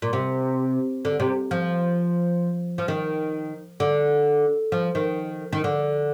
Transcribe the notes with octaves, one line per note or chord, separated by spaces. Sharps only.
A#2
C3
D3
C3
F3
F3
D#3
D3
F3
D#3
D#3
D3